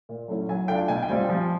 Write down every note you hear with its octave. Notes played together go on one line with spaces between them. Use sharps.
A#2
F#3 A3 C#4 E4
F#3 G#5
A3 D4 F4 G5
B2 G#5
G5
G3 C4 F4 G#5
F3